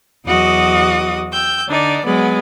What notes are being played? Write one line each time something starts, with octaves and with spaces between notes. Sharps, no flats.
E2 F#3 F#4 D#5 D6 D#6
G5 E6 G6
D3 D4 D#4 D5
F#3 G#3 B3